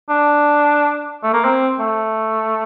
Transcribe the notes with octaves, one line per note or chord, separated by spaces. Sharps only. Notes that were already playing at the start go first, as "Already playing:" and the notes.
D4
A3
A#3
C4
A3